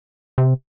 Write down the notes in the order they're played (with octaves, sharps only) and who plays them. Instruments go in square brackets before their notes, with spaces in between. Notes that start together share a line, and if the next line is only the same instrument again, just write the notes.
[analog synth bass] C3